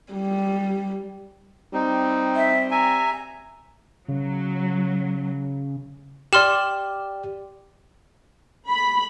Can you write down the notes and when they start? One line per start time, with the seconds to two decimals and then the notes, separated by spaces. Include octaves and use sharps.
0.13 G3
1.73 G3 C4 D#4
2.36 E5
2.71 E5 G#5 A#5
4.08 C#3 F#3
6.33 G4 D5 C6 F6 E7
8.69 B5